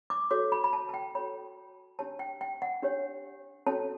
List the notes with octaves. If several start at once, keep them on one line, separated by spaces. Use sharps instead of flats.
D6
F#4 A4 C#5 D6
B5
B5
A5
A5
G5
F#4 A4 C#5 B5
D4 G4 C#5 A5
G5
G5
F#5
D4 G4 C#5
C#4 F#4 A4 C#5 A5